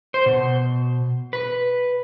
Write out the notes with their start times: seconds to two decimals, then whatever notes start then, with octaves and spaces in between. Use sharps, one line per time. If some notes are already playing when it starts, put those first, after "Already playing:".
0.14 C5
0.26 B2
1.33 B4